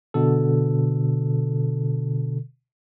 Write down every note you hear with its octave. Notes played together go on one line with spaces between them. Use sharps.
B2 D3 A4